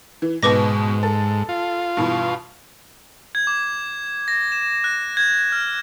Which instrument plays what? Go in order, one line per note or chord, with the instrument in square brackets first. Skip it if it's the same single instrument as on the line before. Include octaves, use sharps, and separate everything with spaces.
[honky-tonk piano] E3
[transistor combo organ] G#2 [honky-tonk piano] B2 D#4 [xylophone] B4 D6 A#6
[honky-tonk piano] A4
[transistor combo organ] F4
[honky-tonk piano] G2 B2 E3
[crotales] G#6
D6
A#6
E7
F#6
G#6
F6